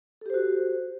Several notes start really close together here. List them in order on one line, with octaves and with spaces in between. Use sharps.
A4 G4 C5 F#4